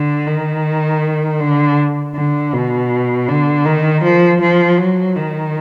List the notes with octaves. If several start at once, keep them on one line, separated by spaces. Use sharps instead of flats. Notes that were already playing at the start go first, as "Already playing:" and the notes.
Already playing: D3
D#3
D3
D3
B2
D3
D#3
F3
F3
F#3
D#3